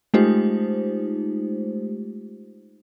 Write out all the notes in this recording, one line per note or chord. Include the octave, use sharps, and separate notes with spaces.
G#3 A3 D#4 F4 G4 C5